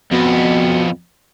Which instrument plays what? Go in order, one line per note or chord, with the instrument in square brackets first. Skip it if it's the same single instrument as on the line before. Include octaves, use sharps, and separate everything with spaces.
[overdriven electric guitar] F2 B3 [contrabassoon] B2